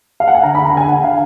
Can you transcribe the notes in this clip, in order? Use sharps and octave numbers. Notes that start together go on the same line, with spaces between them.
F5
F#5
G#5
D3 A#5
B5
D3
A#5
D3 G#5
D3 F#5
D3 F5